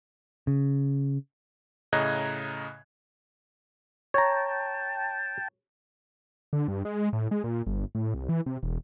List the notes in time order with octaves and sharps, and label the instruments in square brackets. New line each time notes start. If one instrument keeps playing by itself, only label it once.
[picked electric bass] C#3
[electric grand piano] A2 C#3 D#5 A#5 F#6 G#6
[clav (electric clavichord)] C#5 A#5 [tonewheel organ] G5 A5
[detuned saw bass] D3
G2
G#3
A2
G#3
A#2
G1
A2
C2
E3
C3
E1